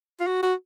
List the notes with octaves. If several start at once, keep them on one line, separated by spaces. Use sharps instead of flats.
F4
F#4
F#4